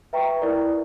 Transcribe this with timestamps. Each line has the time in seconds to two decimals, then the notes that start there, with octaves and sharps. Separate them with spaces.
0.13 B4 E5 G5 A#5 C#6
0.42 E4 A#4 D5